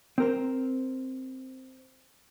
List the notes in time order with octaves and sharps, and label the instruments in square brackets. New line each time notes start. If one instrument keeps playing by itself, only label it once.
[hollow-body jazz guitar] C4 A#4 C5